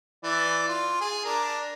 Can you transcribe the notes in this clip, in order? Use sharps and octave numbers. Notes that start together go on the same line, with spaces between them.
E3 D5
F4
G#4
D4 A#4